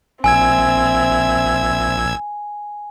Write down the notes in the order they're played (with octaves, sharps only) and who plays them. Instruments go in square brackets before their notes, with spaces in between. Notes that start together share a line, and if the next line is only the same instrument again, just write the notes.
[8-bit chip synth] A#1 E6 G#6 [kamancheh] C4 E5 [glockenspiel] G#5